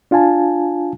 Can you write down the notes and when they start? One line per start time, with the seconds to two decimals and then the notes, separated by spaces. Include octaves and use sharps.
0.11 D4 F4 F5 G#5 A5